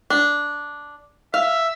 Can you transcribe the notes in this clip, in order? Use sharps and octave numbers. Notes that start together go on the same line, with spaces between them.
D4
E5 F5